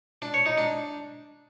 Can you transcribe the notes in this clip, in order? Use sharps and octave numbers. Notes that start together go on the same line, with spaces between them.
D4
C#5
D#4
D4